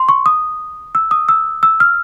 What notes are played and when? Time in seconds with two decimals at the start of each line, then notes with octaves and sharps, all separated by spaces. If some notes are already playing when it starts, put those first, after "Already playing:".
Already playing: C6
0.09 C#6
0.26 D#6
0.95 E6
1.11 D#6
1.29 E6
1.63 E6
1.80 F6